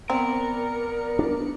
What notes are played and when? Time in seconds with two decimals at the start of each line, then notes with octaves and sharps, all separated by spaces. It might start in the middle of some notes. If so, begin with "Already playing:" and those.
0.10 B3 C4 A#4 D5 C#7
1.19 D4